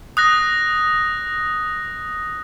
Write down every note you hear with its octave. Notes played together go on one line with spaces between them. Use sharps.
D#6 F#6 A#6